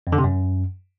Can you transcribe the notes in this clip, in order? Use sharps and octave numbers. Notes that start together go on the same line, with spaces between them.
F2
D3
C3
F#2